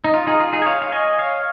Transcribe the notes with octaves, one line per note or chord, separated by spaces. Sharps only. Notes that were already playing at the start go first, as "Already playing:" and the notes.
D#4
F4
D#4 G#4
F4
D#4 G#4
G#5
C#5 F5
F5
D#5 G#5
C#5 F5